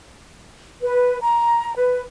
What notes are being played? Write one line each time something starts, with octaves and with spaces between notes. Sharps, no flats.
B4
A#5
B4